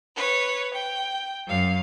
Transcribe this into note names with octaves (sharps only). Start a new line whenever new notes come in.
B4 C#5
G5
F#2 F5